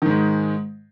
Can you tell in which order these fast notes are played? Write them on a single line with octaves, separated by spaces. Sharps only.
D#3 G#2 G#3